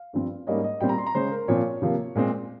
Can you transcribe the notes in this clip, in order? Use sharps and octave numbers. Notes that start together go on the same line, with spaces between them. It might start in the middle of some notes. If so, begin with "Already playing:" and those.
Already playing: F5
G2 F3 C4
G#2 G3 A#3 C#4 D#5
D#5
A#2 G3 C4 G5
A#5
C6
A#5
C#3 G#3 C#4 C5
A#4
A#2 F3 C4 C#5
C3 F3 A#3
A#2 G#3 C4